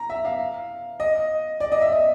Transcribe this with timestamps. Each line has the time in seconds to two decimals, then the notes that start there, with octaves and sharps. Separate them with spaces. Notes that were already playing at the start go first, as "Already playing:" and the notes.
Already playing: A#5
0.10 E5
0.25 F5
1.00 D#5
1.60 D5
1.72 D#5
1.81 E5
1.92 D#5